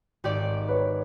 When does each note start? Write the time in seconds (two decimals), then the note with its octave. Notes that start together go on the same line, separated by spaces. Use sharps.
0.24 G#1 G4 D5
0.69 B4 C#5